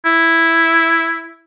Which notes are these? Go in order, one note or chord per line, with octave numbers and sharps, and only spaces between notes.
E4